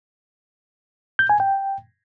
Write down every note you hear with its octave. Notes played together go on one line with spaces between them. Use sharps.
G6
G#5
G5